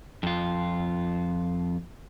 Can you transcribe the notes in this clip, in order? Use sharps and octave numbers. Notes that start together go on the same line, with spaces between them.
F2 F4